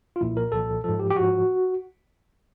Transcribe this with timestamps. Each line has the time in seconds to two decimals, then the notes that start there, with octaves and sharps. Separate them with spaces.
0.16 F4
0.21 C2 A#2 F3 E4
0.37 A#4
0.52 C2 A#2 F3 A4
0.84 G#2 F3 A4
0.99 G4
1.10 G4
1.16 G#2 F3 F#4